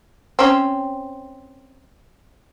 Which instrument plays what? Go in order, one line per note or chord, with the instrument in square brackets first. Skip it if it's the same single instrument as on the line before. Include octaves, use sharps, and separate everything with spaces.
[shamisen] C4 C#4